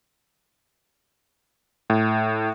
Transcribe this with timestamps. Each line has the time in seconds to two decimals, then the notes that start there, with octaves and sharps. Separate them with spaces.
1.90 A2